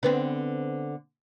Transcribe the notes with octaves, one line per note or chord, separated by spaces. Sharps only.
D3 B3 C4